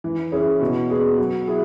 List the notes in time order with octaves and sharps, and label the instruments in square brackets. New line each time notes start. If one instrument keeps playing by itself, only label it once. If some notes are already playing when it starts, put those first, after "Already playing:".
[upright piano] E3
C#4 E4 G#4
B2
B3 G#4
F#3
E4 G#4